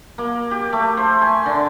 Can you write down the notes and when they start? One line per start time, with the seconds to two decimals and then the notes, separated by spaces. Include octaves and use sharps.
0.18 A#3
0.51 G4
0.73 A3
0.97 C5
1.22 G#5
1.46 D3